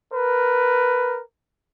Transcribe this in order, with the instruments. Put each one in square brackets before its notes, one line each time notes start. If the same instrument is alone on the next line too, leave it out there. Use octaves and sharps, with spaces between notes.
[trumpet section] A#4 B4